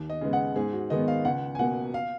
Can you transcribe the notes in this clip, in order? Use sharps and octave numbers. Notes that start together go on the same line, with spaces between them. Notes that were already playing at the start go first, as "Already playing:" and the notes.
Already playing: D#2
D#5
C#3 G#3 B3
F#5
G#2 G#4
F#4
D#3 G#3 B3 D#5
F5
C#2 F#5
G#5
B2 A#3 F#5
F5